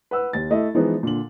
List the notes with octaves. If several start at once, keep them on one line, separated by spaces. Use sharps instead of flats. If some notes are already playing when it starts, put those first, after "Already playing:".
B4 F#5 E6
D#2 A6
A3 E4 D#5
E3 F3 G#3 B3 D#4
A#2 D3 F#7